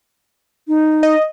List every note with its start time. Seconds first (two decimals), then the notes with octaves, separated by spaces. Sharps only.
0.68 D#4
1.03 D#5